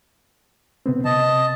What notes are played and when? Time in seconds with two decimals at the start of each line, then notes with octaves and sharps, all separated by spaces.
0.86 C3 B3 C4
1.05 C3 D#5 A5